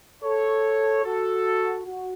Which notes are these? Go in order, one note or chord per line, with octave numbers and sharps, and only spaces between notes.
A4 C#5
F#4 A4
F#4